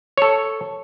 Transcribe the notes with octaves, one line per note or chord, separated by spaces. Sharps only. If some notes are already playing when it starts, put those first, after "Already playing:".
A4 C#5